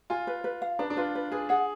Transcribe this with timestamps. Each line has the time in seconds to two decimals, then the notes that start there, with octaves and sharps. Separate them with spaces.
0.10 F4 G#5
0.27 B4
0.44 B4
0.62 F5
0.79 D4 B4
0.90 D4
0.97 F4 B4
1.15 B4
1.32 G#4 B4
1.49 G#4 F#5